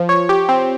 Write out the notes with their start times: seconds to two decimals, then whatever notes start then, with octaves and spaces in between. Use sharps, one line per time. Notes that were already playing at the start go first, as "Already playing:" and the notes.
Already playing: F3
0.09 C#5
0.29 G4
0.49 C4